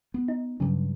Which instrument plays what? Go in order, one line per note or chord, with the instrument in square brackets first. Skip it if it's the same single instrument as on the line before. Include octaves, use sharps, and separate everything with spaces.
[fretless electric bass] B3
[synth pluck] D#4
[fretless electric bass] G2 F#3 [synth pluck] C#3